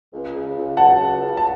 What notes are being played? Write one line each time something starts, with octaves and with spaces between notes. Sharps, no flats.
C#2
C#3
C#2
F#3 F#5 A5
C#2
C#3
A5